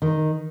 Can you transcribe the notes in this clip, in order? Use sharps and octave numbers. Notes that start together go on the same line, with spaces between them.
D#3